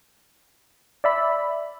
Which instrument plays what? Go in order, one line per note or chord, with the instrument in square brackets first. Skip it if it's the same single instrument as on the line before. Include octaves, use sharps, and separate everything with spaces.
[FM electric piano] D5 E5 B5